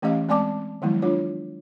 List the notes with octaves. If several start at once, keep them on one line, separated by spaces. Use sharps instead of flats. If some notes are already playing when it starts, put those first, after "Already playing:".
E3 A3 C#4 G4 D#5 F5
G#3 C4 D5 G#5 A5 D6
D#3 F3 F#3 G#3 B3 E4
D4 F4 C#5